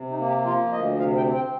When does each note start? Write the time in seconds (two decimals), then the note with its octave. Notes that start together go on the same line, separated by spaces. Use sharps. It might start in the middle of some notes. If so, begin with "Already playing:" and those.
Already playing: C3
0.10 D#4
0.18 A#3
0.28 G4
0.45 F3 F4
0.72 D2 D#5
0.99 C3 F5
1.17 G5
1.25 C4
1.35 G5